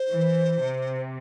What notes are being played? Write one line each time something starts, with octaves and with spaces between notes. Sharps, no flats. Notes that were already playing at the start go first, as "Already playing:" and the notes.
Already playing: C5
E3
C3